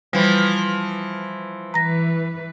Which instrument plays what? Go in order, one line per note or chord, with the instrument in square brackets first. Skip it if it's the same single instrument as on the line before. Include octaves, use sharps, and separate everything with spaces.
[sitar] E3 F3 [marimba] G3
[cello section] E3 B4 [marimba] A#5 A#6